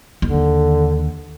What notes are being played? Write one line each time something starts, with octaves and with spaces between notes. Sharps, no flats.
D#2 D3